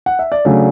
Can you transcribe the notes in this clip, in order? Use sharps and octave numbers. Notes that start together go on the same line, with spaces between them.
F#5
E5
D5
C#3 F#3 A3 D4 C#5